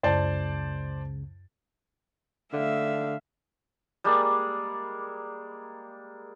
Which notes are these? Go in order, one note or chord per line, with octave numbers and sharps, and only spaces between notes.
C#2 F#2 C#3 C5 D5 A5
D3 A3 E5 F5
G3 G#3 A#3 D5